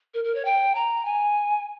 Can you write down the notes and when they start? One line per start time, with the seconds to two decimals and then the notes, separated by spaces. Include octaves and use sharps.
0.14 A#4
0.24 A#4
0.35 C#5
0.45 G5
0.75 A#5
1.05 G#5